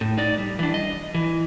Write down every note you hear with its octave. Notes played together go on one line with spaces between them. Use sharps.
A2
D#4 D5
G3
E3 D4
D#5
E3